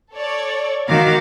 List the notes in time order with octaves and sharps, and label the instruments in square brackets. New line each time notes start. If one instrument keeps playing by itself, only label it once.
[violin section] A4 C#5 D5
[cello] D#3 F#4 [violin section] F5 D6